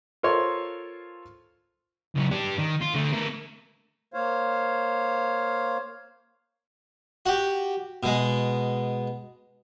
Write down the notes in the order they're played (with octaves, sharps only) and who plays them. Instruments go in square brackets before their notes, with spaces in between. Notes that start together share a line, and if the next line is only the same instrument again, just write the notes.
[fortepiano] F4 A4 A#4 C5 C#5 C6
[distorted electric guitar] C#2 F#3
D4 G4
D#3
F4
D3 A3
A3 A#4
[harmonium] A#3 C5 C#5 F5
[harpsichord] F#4 G4
B2 G#3